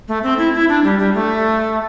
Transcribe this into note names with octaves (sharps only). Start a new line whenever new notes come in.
A3
C4
E4
E4
D4
G3
G3
A3